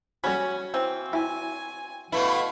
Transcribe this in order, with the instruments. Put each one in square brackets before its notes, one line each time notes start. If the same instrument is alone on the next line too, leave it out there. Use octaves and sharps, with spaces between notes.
[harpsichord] G3 B5 [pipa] C#4 [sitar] F#4
[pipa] E3 C4
[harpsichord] E4 [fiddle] G#5
[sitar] B2 A3 E4 [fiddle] B4 F5